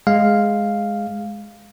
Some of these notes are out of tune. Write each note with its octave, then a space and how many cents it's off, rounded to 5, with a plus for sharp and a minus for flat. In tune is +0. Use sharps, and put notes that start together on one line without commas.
G#3 +0 F5 +0